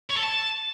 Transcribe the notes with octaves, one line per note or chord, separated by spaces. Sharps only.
C#5
A4
A5